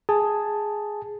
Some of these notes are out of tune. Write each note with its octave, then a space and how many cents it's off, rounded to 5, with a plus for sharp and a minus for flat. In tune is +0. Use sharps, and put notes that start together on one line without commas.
G#4 +0 A5 +0